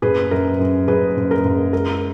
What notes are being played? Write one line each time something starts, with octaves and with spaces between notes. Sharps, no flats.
F#1 G#4 B4
F#2 A#4
F#2
F#1 G#4 B4
F#1
A#4
F#1
G#3 A#4